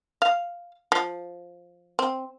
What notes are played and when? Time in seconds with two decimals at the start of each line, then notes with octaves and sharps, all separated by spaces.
0.22 F5
0.92 F3
1.99 C4